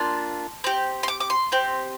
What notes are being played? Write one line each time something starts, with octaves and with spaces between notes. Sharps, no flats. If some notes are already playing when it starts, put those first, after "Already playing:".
Already playing: A#3 D4 F4 C6
C4 G4
C6
D6
D6
C6
C4 G4